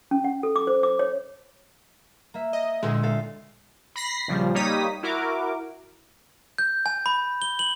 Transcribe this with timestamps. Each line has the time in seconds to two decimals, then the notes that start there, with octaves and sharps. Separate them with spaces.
0.11 C#4
0.24 F#5
0.43 A4
0.56 D6
0.67 C5
0.83 D6
0.99 C#5
2.34 A#3 E5
2.53 D#5
2.83 D2 A#2 G#3 E6
3.03 A4 F5
3.96 B5 A#6 C7
4.28 A#1 C#3 F3 G3
4.55 G3 A#3 D#4 C#5 D#6 B6
5.03 E4 F#4 A#4 D6
6.58 G6
6.86 G#5
7.06 B5
7.42 G7
7.59 F#7